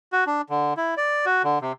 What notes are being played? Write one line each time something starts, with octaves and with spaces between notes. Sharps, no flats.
F#4
D4
D3
E4
D5
F#4
D3
C3